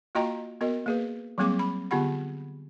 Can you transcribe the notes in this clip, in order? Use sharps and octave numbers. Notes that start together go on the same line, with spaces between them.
A#3 F4 F#4 D#5 G5 A#5
B3 F#4 A#4 D#5
A#3 G#4 B4
F#3 G3 A#3 C4 G#4 D6
B5
D3 B3 F4 G4 F#5 B5